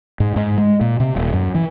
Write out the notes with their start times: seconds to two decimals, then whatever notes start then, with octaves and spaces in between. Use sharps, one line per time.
0.20 G#2
0.36 G#2
0.58 G#3
0.81 A#2
1.00 C3
1.16 D#1
1.33 F#2
1.55 E3